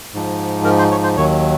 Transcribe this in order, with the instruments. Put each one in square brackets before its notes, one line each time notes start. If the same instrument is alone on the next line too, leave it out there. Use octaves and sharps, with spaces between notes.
[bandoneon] G#2 F3
A#4
C5
C#5
C5
D#2 D#3 F#3 C#5